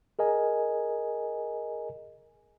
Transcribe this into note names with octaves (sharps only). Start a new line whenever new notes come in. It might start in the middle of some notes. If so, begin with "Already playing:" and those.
G#4 A#4 D#5 G#5